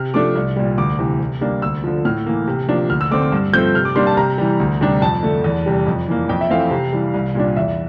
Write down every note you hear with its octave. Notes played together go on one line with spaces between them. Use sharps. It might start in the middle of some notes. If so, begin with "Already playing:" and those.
Already playing: C3 F6
F3 A3 D4 D6
C2
A#2 G3
D2 D6
C3 E3
C3
G3 A#3 D4
D2 E6
D3 F3
A2 F6
E3 A#3
C3
F3 A#3 D4
D2 F6
E6
D3 A3 C4 D6
D6
G2
F3 A3 C4 G6
C3 F6
D6
G3 A#3 D4 C6
A5
C3 A#5
E3 G3
D2
C3 G3 D4
F2 A5
D3 A3
E2
C3 G3
F2
E3 A#3
F2 G5
E5
E3 A3 C4 F5
C3
E3 G3
C2
A#2 G3 D4
E2 E5